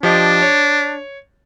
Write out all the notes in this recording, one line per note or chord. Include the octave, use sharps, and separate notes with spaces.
F3 D4 G4 D#5
C#5